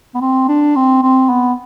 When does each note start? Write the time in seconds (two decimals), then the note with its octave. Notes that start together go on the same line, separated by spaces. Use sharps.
0.15 B3
0.21 C4
0.49 D4
0.76 C4
1.03 C4
1.29 B3